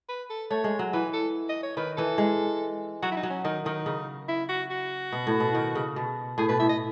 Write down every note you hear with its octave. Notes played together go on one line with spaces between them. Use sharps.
B4
A4
A3 C#5
G#3
F#3
E3 B4
A4
D#5
C#5
D#3 B4
E3 A4
G#3
F#3 F#4
E4
D#4
F#3
C#4
D#3 D#4
D#3 D#4
C#3
E4
F#4
F#4
B2
A2
B2
D#3
C#3
B2
A2 G#4
B2 B4
A2 E5
D#5